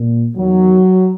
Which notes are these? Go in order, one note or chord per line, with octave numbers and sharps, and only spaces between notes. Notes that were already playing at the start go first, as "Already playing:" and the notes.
Already playing: A#2
E2 D#3 F#3